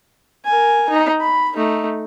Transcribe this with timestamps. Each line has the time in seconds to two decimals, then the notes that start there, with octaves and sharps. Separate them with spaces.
0.45 A#4 G#5
0.89 D#4
1.21 B5
1.56 A3 D#4